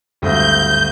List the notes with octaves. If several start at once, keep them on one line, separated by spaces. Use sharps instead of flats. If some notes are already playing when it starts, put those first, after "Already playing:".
G#1 D2 G2 G6